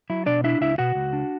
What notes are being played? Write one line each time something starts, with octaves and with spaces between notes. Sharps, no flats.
F#3 E4
B2 D4 D5
D4 E4 E5
C#2 E4 E5
B2 F#4 F#5
C#2
D4